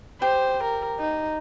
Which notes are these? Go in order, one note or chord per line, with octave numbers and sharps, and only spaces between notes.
G4 C5
A#4
D#4